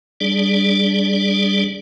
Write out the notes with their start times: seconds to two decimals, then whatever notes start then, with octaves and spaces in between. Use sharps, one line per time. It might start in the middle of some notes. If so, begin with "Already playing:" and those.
0.21 G3 D4 G#4 D5